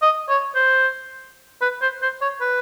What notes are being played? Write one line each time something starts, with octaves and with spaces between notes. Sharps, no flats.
D#5
C#5
C5
B4
C5
C5
C#5
B4